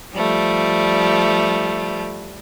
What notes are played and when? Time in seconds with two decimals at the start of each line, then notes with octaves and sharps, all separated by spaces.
0.15 F3 G3 A3